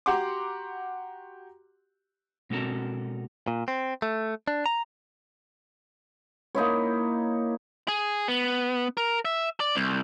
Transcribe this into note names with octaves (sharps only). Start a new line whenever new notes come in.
F#4 G4 F#5 A#5 C6 D6
B2 G#3 C4 F#4 A4 A#4
A#2
C4
A3
D4
A#5
A#3 D#4 E4 C#5
G#4
B3
A#4
E5
D5
C2